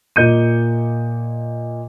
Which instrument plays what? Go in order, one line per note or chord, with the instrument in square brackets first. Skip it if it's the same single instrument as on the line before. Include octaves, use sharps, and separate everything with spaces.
[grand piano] A#2 A#3 D#5 G6 C#7 D#7